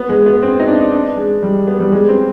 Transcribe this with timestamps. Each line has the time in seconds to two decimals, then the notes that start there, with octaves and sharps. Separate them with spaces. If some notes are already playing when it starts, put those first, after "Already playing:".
Already playing: B3
0.09 G#3
0.26 B3
0.43 C4
0.60 D#4
0.68 D4
0.92 D4
1.17 G#3
1.43 G3
1.67 B3
1.80 G3
1.92 G#3
2.09 C4